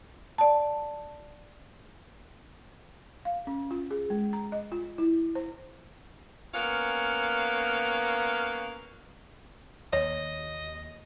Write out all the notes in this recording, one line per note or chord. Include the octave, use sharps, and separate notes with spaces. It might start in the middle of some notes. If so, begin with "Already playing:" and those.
D5 A5
F5
C#4
F4
G#4
G#3
A#5
D#5
F4
E4
C5
A#3 B3 C#4 F5
D#2 C#5 D#5